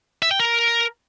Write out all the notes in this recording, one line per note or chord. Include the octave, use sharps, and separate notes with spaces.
E5
G5
A#4